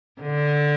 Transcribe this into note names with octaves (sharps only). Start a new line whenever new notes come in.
D3